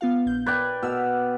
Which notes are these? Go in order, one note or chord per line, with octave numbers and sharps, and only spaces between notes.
B3 F4 F5
A#1 G6
B4 D5 G5 G#6
B2 E6 F6